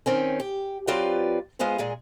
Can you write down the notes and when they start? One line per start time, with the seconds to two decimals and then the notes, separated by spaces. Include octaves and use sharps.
0.06 D#3 C4 C#4
0.40 G4
0.87 F#3 C4 F4 G4 B4 D5
1.59 G#3 B3 F4 G#4 C5
1.78 A#2 G#3 G#4